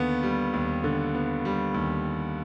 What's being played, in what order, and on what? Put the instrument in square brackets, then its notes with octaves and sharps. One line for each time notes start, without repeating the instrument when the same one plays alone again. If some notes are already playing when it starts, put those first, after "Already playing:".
Already playing: [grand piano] D#2 D3 B3
G3
D#2
D3
B3
G3
D#2